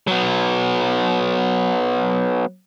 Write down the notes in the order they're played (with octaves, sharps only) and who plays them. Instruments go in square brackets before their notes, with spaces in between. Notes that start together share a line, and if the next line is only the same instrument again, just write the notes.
[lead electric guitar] F#3 B3